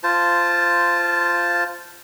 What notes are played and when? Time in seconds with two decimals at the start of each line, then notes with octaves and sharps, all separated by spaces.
0.04 F4 C5 A5